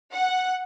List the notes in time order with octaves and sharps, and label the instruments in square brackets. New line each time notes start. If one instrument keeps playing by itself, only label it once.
[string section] F#5